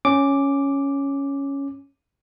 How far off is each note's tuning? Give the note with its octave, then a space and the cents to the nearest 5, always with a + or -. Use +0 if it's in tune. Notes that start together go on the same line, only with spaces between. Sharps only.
C#4 +0 D6 +0